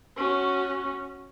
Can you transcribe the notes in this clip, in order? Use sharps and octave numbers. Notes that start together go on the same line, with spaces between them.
C#4 F#4